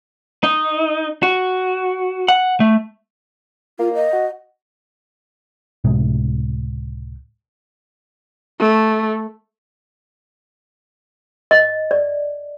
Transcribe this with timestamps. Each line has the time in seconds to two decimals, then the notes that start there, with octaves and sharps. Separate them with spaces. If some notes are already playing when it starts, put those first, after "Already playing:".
0.43 D#4
1.23 F#4
2.28 F#5
2.60 A3
3.79 A#3 F4
3.94 D#5
4.13 F#4
5.84 C#2 A2 C3 G#3
8.60 A3
11.51 D#5
11.91 D5